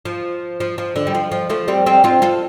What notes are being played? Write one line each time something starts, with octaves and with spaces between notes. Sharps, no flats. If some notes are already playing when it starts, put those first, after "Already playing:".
F3
F3
F3
D3
G3
F3
F3
F3 A3
G3 C4
G3 C4
C4 F4
F4 A4